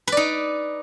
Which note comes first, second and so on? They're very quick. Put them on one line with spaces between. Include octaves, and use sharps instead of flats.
B4 D5 D#4